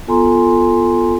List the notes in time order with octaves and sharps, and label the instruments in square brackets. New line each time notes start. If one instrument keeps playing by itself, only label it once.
[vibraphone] B3 F4 A4 G#5 A#5 C6